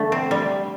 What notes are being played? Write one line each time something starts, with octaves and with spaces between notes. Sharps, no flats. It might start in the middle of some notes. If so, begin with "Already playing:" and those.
Already playing: D3 A3
C4
G3